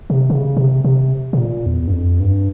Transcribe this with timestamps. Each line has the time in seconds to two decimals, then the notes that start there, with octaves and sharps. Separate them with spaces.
0.10 C3
0.30 C#3
0.57 C3
0.84 C3
1.33 C3
1.38 A#2
1.66 E2
1.87 G2
1.92 F2
2.20 G2